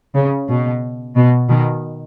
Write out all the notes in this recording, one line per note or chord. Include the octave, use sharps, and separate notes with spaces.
C#3
B2
B2
B2 D#3